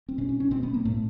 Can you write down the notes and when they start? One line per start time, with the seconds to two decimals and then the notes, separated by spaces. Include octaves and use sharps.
0.09 C4
0.18 B2 C#4
0.29 C#4
0.40 C#4
0.51 B2 C4
0.63 B3
0.74 A#3
0.85 A2 A3